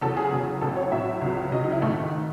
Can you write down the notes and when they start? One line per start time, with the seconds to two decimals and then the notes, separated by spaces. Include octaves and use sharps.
0.01 E2 C#3 F#3 A4
0.17 G#4
0.32 E2 C#3 F#3
0.61 A1 A2 F#3 A4
0.76 C#5
0.92 A1 A2 F#3 E5
1.22 C#2 C#3 F#3
1.51 C#2 C#3 F#3 D#5
1.64 D#4
1.72 E4
1.82 A1 G#2 D#3 A3
2.11 D#3